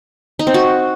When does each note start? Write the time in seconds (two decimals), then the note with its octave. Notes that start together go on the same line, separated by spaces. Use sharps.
0.39 D#4
0.47 C4
0.54 F#4